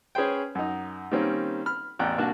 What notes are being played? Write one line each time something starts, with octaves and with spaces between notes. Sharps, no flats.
C#4 G#4 B4 C5 G5
F#2 D#4
D#3 G3 A#3 C4 C#4
B5 F6
A1 E2 G5 A#5 F#6
C2 A#3 D4 F#4 A5 F#6